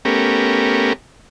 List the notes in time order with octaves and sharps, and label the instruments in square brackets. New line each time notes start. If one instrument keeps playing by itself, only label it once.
[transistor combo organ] A3 B3 C#4 G4 A#4